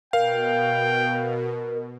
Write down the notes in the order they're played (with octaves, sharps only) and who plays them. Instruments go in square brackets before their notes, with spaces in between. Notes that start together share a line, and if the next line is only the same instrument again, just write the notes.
[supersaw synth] B2 [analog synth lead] A#4 [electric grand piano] F5 [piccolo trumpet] G5